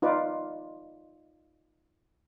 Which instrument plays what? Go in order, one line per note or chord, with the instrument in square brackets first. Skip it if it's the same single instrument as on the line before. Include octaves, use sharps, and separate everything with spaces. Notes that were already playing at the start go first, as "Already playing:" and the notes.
[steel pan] D#4 F4 B4 D5